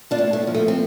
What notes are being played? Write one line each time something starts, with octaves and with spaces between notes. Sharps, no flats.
D4 F4
A2
A3
F3
A3
C4